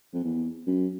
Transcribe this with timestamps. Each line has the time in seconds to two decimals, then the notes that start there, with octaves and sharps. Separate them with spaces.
0.14 F2
0.24 E2
0.67 F#2